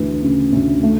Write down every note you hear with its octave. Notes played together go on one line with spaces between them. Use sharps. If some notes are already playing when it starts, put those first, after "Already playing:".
Already playing: D2 E3
C#3
D2
A3